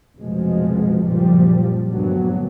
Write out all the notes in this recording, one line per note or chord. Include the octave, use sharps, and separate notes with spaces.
F1 B1 B2 F3 G#3
F#1 A#2 F3 G3
D2 G2 A#2 F#3 B3